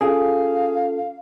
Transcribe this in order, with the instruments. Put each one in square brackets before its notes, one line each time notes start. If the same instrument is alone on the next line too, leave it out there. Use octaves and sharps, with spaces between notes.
[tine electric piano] C#4 F4 A4 [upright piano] G#4 [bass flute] F5